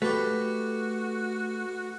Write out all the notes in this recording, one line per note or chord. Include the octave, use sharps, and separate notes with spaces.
A3 F#4 G4 B4